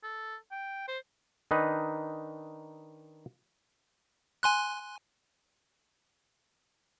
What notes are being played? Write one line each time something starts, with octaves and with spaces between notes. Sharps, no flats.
A4
G5
C5
D#3 D4 D#4 B4
G#5 C6 F#6